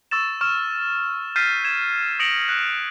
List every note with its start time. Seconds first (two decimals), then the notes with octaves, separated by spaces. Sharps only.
0.11 C#6 E6 A6 E7
0.41 C#6 F6 E7
1.36 F6 G6 A6 B6 C7 D#7
1.64 G#6 E7
2.20 D#6 A#6 C#7 D7 F7 F#7
2.49 F#6